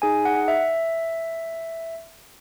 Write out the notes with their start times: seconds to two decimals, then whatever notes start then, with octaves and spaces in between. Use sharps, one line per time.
0.02 D#4 G#4 G#5
0.25 F#5
0.48 E5